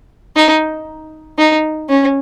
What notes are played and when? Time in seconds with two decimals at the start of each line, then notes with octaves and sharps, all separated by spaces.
0.36 D#4
1.38 D#4
1.89 C#4